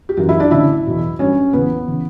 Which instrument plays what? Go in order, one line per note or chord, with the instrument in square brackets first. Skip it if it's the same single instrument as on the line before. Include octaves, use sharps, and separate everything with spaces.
[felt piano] G4
F#2 E3 F#3 F#4
E4 E5
D4 D5
D2 C#3 F#3 E4 E5
E2 B2 F#3
G2 F#3 C#4 C#5
E2 C#3 F#3 B3 B4
C#3 E3